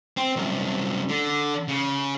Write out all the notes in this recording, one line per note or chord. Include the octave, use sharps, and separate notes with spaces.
C4
C2 F#2
D3
C#3